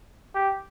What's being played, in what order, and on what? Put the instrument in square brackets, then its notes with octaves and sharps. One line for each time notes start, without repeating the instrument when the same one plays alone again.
[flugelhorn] G4